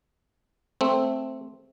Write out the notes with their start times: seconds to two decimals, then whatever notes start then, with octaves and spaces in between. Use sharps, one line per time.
0.81 A3 C4